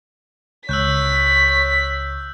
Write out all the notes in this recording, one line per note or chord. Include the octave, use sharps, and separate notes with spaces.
C#2 C#5 E6 F#6 G6 B6